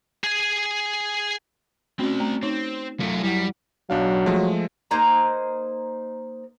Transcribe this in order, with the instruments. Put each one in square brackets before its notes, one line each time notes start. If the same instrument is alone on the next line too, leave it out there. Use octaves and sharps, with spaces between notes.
[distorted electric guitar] G#4 G#5
[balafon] A3 C#4 F#4 [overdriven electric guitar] C4 D5
[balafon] A3 A#5
[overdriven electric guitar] C4 [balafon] D#4 C#5
[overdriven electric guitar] F#2 [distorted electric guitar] A3 F4
[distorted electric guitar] G3 [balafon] E4 F#5
[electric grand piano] B1 D4 F5 [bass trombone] F#3
[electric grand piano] F3 G#3 A3
[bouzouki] A#3 D#4 C5 A#5